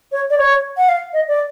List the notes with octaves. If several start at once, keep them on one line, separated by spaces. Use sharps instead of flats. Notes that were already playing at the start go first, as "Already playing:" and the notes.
C#5
D5
C#5
F#5
F5
D#5
D5